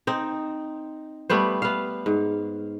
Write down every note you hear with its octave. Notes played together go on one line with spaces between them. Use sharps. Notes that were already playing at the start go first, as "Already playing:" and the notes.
C4 D#4
G3 A3 B3 C5
B3 F5
G#2